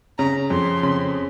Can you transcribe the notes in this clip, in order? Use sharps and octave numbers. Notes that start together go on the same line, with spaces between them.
C#3 A#5
F2 C6
C#3